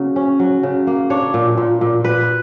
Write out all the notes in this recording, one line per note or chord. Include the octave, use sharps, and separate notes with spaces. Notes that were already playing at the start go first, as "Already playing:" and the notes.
Already playing: C#3 F#3 A#3
C#4
F#3
C#3
A#3
D4 C#5
A#2
A#2
A#2
A#2 B4